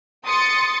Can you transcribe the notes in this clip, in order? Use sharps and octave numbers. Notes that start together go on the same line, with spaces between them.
C6 D#6 A6 C#7